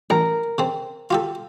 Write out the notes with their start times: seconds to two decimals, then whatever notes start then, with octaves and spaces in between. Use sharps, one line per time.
0.10 A1 A#4
0.58 C#3 C4
1.11 F4 G4 A4